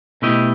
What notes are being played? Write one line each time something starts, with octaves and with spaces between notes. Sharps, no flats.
B2 A3 E4 G4 D#5